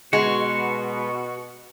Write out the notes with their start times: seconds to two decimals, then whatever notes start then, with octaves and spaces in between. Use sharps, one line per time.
0.13 B2 G#3 F#4